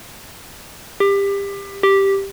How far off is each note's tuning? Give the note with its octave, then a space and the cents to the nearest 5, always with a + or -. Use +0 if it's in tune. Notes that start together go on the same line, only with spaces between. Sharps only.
G4 +25
G4 +0